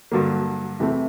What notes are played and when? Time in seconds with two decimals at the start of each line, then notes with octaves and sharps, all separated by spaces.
0.12 G2 D3 F#3 A#3
0.80 C3 E3 A3 C4